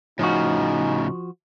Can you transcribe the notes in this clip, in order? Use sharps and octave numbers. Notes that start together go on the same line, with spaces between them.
A2 C#3 F3 D#4 F#4